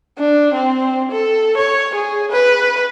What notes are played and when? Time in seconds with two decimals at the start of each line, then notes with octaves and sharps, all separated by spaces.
0.18 D4
0.54 C4
1.11 A4
1.57 C#5
1.95 G#4
2.32 B4